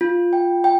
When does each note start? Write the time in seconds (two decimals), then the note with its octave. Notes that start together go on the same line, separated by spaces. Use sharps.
0.01 F4
0.33 G5
0.64 G5